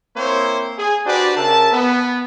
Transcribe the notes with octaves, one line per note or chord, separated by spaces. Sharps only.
A#3 C4 E4 C5 C#5
G#4
D4 F#4 G4 B4 C5 D5
C#3 A#4 E5 A5
B3